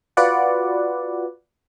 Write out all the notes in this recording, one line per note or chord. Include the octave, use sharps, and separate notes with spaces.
F4 F#4 B4 D5 F#5